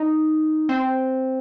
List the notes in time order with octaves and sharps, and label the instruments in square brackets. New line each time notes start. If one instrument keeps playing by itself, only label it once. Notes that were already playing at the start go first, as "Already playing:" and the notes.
Already playing: [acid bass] D#4
C4